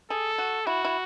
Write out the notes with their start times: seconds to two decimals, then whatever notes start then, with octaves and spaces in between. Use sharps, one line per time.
0.10 G#4 A4
0.38 F#4
0.66 E4 F#4
0.84 E4